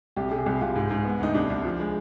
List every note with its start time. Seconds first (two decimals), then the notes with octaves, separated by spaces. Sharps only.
0.16 C2 G4
0.31 C3 G#4
0.46 C2 G4
0.61 C2 F4
0.76 G#2
0.91 G#2
1.05 B3
1.20 D2 D#4
1.34 C2 D4
1.50 C2
1.65 F3
1.80 G#3